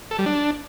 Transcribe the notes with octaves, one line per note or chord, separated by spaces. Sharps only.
A4
G3
D4